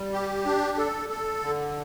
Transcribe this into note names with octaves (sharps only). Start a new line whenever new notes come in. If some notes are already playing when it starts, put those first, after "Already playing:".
Already playing: G3
G4
D4
A4
A4
D3